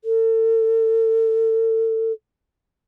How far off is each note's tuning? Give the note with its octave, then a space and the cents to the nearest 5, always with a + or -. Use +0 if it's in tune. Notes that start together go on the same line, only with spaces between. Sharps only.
A4 +35